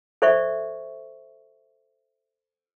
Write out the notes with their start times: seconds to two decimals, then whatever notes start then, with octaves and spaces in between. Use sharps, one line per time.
0.22 A4 C5 D5 E5 C#6